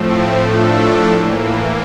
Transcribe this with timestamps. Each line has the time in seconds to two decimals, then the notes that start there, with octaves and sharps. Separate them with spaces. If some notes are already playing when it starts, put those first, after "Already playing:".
Already playing: A2 F3 A3 C4
0.39 A2 F3 A3 D4 A4
1.07 A2 E3 A#3